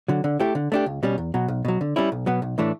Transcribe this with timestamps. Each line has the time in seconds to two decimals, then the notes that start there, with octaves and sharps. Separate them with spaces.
0.08 D3 F#3
0.24 D3
0.40 A3 E4 G4
0.55 D3
0.72 A3 D4 G4
0.86 C#2
1.03 B2 G3 C#4
1.18 E2
1.34 B2 F#3
1.48 B1
1.65 B2 F#3
1.81 D3
1.96 G3 C#4 E4
2.12 B1
2.26 B2 F#3 B3
2.42 B1
2.58 A2 E3 A3 D4